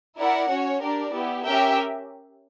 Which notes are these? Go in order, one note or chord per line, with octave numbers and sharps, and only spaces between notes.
E4 A#4 D5 F#5
C#4 F#4 C#5
D4 G4 A#4 D5
B3 E4 G4
C#4 G4 A#4 E5 G5